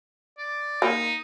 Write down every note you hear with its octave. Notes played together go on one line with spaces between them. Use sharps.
D5
A#3 D#4